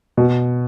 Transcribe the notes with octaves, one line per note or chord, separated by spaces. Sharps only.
B2